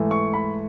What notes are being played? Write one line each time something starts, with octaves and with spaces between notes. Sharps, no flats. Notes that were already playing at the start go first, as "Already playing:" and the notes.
Already playing: G#2 E3 A3
C#6
B5